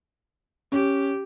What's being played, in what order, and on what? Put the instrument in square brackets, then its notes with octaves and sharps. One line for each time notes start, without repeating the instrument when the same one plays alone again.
[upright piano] C#4 [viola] G4